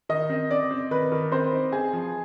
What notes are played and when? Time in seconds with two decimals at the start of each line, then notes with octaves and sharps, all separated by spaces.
0.09 D#3 D#5
0.29 C4
0.50 C4 D5
0.71 C4
0.91 D#3 B4
1.12 D#3
1.32 C4 C5
1.52 D#4
1.72 C4 G#4
1.93 F3